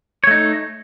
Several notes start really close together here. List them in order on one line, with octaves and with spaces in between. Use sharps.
C#5 A3 D#4